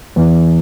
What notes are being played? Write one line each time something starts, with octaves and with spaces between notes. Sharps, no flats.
E2